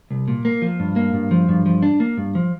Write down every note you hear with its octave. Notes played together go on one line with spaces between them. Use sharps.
C2
A#2
A#3
F3
G2
A#3
G2
F3
G2
F3
D4
A#3
G2
F3